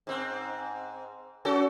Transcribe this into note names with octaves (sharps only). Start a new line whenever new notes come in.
G#2 C4
C#4 F#4 A4